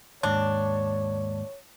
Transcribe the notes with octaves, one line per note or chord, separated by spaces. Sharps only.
D#2 G#2 D4 C#5